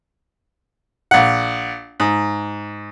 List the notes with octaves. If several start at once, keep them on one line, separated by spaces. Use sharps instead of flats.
A#1 F#5
G#2